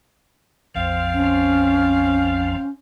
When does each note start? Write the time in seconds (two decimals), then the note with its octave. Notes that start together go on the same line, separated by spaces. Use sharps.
0.75 A#1 F2 F3 C4 C5 F5
1.14 C#4